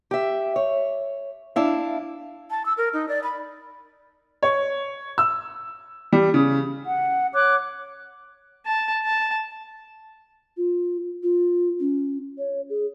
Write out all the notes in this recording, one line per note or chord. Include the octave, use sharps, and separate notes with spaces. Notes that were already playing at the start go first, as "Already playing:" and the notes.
G4 E5
C#5
D4 E4 F5
A5
E6
A#4
D#4
D5
B5
C#5
E6
G3
C#3
F#5
C#5 D6 F#6
A5
A5
F4
F4
C#4
C#5
G#4